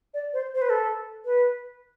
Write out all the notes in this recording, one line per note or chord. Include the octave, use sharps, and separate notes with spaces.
D5
C5
C5
B4
A4
B4